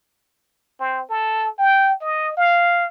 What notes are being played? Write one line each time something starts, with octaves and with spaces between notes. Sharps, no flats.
C4
A4
G5
D#5
F5